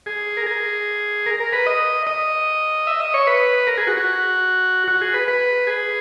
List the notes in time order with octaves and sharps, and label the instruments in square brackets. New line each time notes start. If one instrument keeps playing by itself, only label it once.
[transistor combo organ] G#4
A#4
G#4
A#4
A#4
B4
D#5
D#5
E5
D#5
C#5
B4
A#4
G#4
F#4
F#4
F#4
G#4
B4
B4
G#4